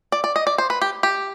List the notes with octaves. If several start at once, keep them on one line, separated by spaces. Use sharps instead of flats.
D5
D5
D#5
D5
C5
B4
G4
G4